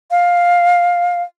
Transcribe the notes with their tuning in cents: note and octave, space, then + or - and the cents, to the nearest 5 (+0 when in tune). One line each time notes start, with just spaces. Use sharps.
F5 +10